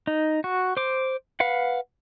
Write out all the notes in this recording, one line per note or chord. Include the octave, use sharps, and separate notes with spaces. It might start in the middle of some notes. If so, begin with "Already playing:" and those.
D#4
F#4
C5 D6
B4 F5 F#5